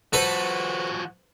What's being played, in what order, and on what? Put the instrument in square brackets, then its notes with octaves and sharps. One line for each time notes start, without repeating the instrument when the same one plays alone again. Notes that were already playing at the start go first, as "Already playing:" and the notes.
[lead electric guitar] F3 F#4 [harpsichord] A4 B4 C5